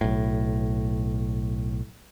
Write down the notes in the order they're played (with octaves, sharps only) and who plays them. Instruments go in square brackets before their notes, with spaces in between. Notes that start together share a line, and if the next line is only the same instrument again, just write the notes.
[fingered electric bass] B1 A2